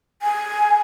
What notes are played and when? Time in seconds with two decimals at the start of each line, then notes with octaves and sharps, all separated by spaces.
0.22 G#5